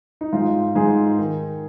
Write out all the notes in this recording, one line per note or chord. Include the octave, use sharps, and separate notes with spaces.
D#4
G#2 F4
G#2 D#4 G#4
D#3